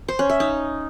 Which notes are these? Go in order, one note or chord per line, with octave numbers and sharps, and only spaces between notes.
C5
C#4
E5
D#4